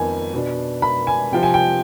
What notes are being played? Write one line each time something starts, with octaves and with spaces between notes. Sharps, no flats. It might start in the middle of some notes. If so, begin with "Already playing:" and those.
Already playing: F2 D#3 B3 G#5
B2 B3 D4
B5
G#5
C3 F3 C4 G5
G#5
G5